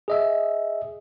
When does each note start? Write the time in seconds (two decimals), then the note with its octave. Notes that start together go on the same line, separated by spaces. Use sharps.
0.08 G#4 D#5 E5